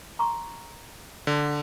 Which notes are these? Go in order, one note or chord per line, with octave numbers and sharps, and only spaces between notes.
A#5 C6 C#6
D3